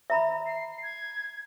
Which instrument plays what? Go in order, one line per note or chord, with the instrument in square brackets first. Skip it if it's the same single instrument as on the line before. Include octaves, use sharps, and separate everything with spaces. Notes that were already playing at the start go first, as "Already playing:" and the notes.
[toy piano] E5 A#5 B5
[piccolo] C7
G#6